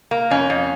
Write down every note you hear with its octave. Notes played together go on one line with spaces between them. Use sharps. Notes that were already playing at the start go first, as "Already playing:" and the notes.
A#3
F2 C#4
F2